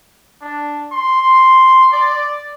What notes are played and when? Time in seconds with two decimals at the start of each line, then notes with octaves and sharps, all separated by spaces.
0.42 D4
0.92 C6
1.92 D5